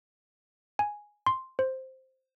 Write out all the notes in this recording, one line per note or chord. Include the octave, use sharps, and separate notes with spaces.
G#5
C6
C5